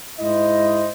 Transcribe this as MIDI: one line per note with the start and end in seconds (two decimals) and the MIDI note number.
0.19 0.89 44
0.19 0.89 64
0.19 0.89 72
0.19 0.89 75